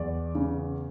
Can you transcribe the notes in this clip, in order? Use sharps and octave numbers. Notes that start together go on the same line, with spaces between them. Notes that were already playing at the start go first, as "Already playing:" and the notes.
Already playing: E2 D5
C#3